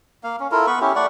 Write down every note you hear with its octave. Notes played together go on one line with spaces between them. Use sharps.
A#3 F5
C#4
E4 F4 A4 A#4
B3 B4 B5 C#6
C#4 E4 G4
A3 D5 F#5 C#6